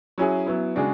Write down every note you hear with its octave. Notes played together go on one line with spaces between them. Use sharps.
F#3 C#4 E4 G#4
F#3 B3 E4
C#3 G#3 D4 F#4